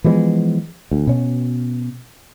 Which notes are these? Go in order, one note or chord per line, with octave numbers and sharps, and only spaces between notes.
E3 F3 G#3 B3
D2
B2 C#4